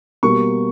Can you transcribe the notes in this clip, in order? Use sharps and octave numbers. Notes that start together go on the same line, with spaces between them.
B2 G3 A#3 C#6